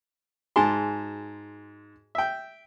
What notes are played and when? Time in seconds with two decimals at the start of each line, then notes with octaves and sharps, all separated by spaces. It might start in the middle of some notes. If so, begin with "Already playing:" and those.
0.56 G#2 F#4 G#4 G#5 A5 C6
2.15 E5 G5